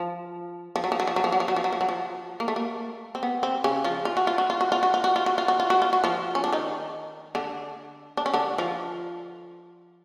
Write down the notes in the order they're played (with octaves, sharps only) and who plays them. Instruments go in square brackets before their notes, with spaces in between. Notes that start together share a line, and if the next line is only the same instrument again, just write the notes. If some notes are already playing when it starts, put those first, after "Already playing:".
Already playing: [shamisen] F3
F3
F#3
F3
F#3
F3
F#3
F3
F#3
F3
F#3
F3
F#3
F3
F#3
F3
A#3
A3
A#3
C4
B3
C4
C#3 C#4
F3 F4
F4
F#4
F4
F#4
F4
F#4
F4
F#4
F4
F#4
F4
F#4
F4
F#4
F4
F#4
F4
F#4
F3 F4
C#4
D4
D#3 D#4
D3 D4
D4
C#4
D3 D4
F3 F4